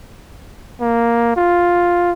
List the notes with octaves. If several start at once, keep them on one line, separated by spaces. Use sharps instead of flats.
A#3
F4